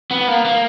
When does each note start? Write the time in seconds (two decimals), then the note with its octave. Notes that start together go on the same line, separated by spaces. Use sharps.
0.11 B3
0.28 A#3
0.45 A#3